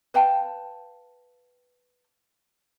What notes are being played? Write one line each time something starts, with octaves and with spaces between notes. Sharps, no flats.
B4 F5 G5 A5